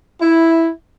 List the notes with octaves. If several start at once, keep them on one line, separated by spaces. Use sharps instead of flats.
E4